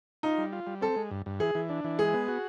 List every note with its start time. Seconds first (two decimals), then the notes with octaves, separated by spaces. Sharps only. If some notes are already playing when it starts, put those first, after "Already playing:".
0.23 D#4 F4
0.38 G3
0.53 F4
0.67 G3
0.81 C4 A4
0.96 G#3
1.11 G2
1.26 G2
1.40 E3 G#4
1.55 E3
1.69 D4
1.84 E3
1.99 G#3 G#4
2.13 B3
2.28 F#4